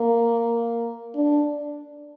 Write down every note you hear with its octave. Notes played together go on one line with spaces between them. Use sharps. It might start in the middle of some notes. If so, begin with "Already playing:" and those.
Already playing: A#3
D4